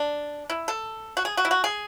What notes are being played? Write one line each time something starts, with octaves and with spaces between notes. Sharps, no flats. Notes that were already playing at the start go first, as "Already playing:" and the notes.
Already playing: D4
E4
A4
F#4
G#4
F#4
E4
F#4
G#4